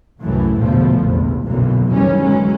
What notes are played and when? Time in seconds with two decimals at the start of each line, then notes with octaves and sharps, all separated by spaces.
0.22 C2 F#2 A2 E3 A3
0.59 A#1 E2 B2 D3 F3 A3
1.02 F1 A#1 E2
1.46 B1 F#2 A#2 D3 E3 F#3
1.88 F#1 C3 D#3 E3 G3 C#4
2.21 D3 E3 F#3 G#3 C#4